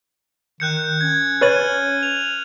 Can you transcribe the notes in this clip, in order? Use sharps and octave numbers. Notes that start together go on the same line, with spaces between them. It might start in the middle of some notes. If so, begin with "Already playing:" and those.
D#3 F#6 G6 C#7
C#4 G#6
B4 C#5 F6 A6 D#7 F#7
F7